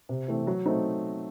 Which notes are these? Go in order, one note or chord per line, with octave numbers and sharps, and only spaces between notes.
C3
E3 A3 C4
F#3
A3 C4 D#4